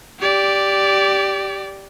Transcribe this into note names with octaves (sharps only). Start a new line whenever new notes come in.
G4 D5